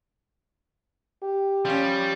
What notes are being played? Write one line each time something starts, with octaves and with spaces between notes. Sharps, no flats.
G4
F3 G3 C#4